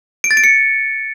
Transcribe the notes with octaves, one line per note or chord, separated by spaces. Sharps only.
D7
A6
D7
C#7